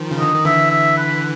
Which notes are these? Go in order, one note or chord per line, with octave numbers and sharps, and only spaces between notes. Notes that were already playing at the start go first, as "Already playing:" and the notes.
Already playing: D#3 F3
C#3
D3 D#5
D#3
D3 E3 E5
E5
B4